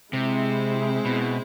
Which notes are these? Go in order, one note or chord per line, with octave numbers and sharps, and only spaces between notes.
C3 G#3 C4 E4 G#4
B2